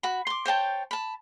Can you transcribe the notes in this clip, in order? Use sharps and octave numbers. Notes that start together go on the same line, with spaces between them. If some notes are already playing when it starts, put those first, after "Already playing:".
F#4 B5
C6 D6
C5 C#5 G5 A5
A5 B5